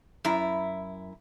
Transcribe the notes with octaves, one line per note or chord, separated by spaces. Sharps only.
F#2 E4 A#5